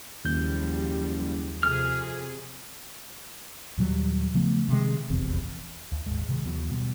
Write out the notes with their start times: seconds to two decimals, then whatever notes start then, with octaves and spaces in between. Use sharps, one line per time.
0.25 F#1 D#2 F3 G3 G6
1.63 F2 C3 G#4 F6
3.78 D#2 A#2 F#3 G3
4.34 C#3 F3 A3 B3
4.69 C3 D#3 G#3
5.10 F1 A#1 E2 C3
5.92 D2
6.06 D#1 G#1 G#3
6.29 C3 D#3 G#3
6.44 D#2 E3 F#3 B3
6.71 B2 D3 G3 B3